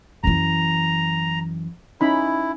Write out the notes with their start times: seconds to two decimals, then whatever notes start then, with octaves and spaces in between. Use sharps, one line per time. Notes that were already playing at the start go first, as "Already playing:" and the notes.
0.24 F#2 E3 A#5
2.01 C#4 D#4 E4 B5